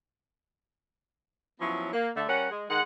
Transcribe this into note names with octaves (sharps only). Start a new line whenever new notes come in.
F3 F#3 B3 C#4 E4
A#3
D3 A3
G3 C#4 A#4 F#5
G#3
D#3 G#3 F#5